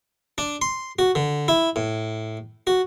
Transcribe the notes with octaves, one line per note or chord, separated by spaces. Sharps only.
D4
C6
F#4
D3
E4
A2
F#4